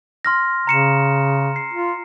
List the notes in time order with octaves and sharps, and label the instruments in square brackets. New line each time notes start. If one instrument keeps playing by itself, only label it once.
[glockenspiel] C6 F6 A#6
[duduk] C#3 [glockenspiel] A#5 C#7 E7
[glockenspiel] C7
[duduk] F4